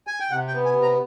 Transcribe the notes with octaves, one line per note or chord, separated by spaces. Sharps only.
G#5
G5
C3 F#5
G5
B3
G#5
C3
A#5